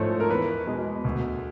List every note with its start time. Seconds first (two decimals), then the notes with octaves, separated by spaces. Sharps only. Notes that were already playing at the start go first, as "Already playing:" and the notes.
Already playing: G#2 F3 A3 C5 C#5
0.09 A4
0.20 A#4
0.29 E2 B4
0.67 B2 G#3
1.04 D2